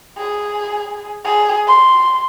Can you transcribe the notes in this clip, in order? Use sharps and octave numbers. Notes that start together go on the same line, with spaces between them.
G#4
G#4
C6